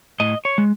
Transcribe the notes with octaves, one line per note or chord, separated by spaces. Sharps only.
A2 D#5
C#5
G#3